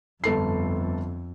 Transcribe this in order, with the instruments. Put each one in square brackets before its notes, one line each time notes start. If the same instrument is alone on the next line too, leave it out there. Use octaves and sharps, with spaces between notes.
[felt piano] G1 A4 C7 [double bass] F2